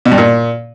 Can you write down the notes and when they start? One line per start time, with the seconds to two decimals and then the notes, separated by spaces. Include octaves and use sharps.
0.05 B2
0.12 G2
0.18 A#2